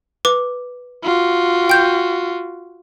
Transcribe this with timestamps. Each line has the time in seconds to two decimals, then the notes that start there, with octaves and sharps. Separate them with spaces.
0.25 B4 D6
1.04 F4 F#4
1.70 G5 G6